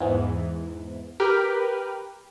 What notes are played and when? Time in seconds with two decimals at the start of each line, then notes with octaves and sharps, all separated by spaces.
0.01 E2 G#2 E3
1.20 G4 A#4 B4 G5 F6